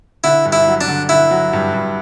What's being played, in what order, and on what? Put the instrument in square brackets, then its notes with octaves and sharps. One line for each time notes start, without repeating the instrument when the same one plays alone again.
[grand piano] D3 [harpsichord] E4
[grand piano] G2
[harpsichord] E4
[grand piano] F#3
[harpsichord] D4
[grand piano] D3
[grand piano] D3 [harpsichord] E4
[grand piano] F#3
G2
G2